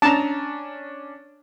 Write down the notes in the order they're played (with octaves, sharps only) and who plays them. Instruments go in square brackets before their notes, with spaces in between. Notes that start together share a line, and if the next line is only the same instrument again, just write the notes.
[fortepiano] C#4 D4 [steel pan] A5 A#5